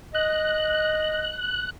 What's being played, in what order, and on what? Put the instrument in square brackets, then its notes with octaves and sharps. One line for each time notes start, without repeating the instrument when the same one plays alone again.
[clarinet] D#5 [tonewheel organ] F#6